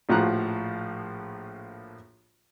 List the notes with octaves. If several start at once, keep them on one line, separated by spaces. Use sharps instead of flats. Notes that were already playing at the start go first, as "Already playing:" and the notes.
A#1 A2 F3 F#4 A#5 F#6